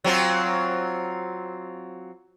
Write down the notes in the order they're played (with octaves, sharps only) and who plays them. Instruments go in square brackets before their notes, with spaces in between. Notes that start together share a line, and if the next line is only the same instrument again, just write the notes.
[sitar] F#3 C4 F4